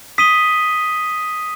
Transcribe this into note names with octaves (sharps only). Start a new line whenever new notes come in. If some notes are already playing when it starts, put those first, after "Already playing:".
D#6 B6 D#7 G7